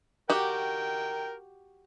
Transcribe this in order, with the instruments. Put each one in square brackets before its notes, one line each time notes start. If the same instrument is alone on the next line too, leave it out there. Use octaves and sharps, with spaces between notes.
[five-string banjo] F#4 G4 [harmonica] A#4 G5